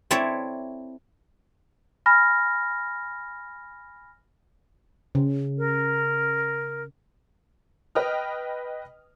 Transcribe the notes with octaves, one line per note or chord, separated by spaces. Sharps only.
C4 E4 A4 C#5 D5 E5
G#5 B5 F6 A#6
C#3
A#4
B4 D#5 G5 D#6 F6